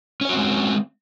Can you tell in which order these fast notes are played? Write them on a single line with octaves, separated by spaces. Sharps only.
C#4 C#5 F#4 C4 G#3